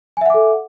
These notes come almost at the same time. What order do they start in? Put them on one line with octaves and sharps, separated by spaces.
G#5 E5 F#5 D6 A4